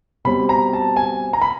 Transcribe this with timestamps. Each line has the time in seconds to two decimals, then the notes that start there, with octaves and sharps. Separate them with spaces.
0.25 B2 G3 C4 B5
0.49 A#5
0.73 A5
0.96 G#5
1.33 A#5
1.42 B5